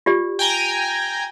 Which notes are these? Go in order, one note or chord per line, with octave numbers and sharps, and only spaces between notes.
F4 G4 D5
G5 G#5 A#5